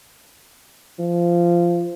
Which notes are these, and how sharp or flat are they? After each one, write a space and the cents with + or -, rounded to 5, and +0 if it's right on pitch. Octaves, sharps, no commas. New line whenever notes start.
F3 -15